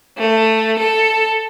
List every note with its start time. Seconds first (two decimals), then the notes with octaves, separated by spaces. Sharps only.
0.18 A3
0.80 A4